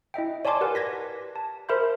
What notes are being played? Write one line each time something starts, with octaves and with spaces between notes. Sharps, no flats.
E4 D#5 E5 G5
C#5 D5 G#5 A5 C6 D6
G4 A#4 B4 F#5 G#5
G#6 A#6 B6
A5
A#4 C5 E5 B5 C6 G6